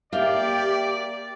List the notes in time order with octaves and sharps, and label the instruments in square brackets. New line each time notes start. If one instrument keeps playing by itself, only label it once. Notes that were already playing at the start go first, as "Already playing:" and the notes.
[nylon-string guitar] A#3 E5 [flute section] G4 [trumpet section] D5 [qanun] F5 G5